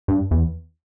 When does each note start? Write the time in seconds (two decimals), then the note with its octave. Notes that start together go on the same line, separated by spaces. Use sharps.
0.08 G2
0.31 E2